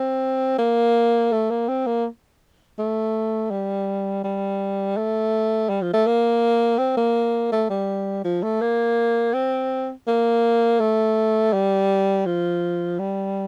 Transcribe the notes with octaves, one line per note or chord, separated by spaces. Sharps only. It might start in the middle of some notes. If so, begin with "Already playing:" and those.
Already playing: C4
A#3
A3
A#3
C4
A#3
A3
G3
G3
A3
G3
F3
A3
A#3
C4
A#3
A3
G3
F3
A3
A#3
C4
A#3
A3
G3
F3
G3